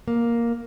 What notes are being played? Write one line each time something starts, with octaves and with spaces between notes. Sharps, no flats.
A#3